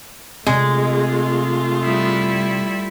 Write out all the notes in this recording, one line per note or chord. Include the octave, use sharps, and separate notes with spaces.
C3 G#3 A3 C4 F4
G3 E4